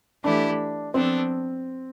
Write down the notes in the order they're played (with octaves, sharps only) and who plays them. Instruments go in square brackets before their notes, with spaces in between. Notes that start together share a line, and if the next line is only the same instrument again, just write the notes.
[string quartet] E3 A3 E4 G4 [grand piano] D4
[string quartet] F3 B3 D4 A4 [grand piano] C4